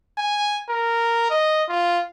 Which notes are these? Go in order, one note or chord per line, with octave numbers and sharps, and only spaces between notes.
G#5
A#4
D#5
F4